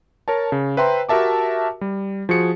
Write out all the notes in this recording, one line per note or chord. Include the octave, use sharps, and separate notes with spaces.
A#4 C#5 A5
C#3
B4 C5 E5 G5 A#5 C6
F#4 G4 A#4 E5 A5 D6
G3
F3 F#4 G#4 C#7